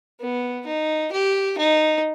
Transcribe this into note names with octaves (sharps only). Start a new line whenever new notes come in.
B3
D#4
G4
D#4